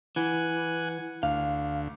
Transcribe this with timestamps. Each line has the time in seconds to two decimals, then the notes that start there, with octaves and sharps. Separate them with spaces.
0.16 E3 F#5 G#5
1.23 D2 F5